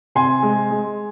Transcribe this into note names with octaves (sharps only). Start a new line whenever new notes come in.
C3 G#5 C6
G#3
G#3